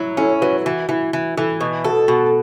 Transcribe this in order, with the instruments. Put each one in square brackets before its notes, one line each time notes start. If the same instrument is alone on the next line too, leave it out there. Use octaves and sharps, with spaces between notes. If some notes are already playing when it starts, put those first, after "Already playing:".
Already playing: [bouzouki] F#3 [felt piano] E4
[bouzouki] C#4 [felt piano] E4 A4
[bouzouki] F#3 [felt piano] F#4 B4
[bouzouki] E3 [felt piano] F#4
[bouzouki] E3 [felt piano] E4
[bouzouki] E3
[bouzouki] E3 [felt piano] E4 A4
[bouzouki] B2
[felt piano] F#4 [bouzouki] A4
[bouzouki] B2 [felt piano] F#4